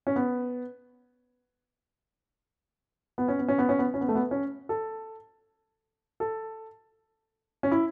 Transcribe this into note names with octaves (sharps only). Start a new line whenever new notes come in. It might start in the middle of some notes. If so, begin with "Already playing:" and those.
C#4
B3
B3
C#4
B3
C#4
B3
C#4
B3
C#4
B3
A3
B3
C#4
A4
A4
C#4
E4